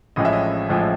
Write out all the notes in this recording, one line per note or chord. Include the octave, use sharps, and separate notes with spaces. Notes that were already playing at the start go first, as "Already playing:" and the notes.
A1 A2 F3 G#3 C#4 D#5
E5
D#5
A1 A2 F3 G#3 C#4